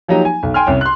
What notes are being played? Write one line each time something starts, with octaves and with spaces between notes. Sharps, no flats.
F3 F#3 A#3 D#4 G4
G#5
B1
G5 G#5 C6 F6
C2 C#4
C6 F#6